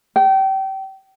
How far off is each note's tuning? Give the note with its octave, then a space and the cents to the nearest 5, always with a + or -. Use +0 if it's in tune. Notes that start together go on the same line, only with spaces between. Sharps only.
G5 -30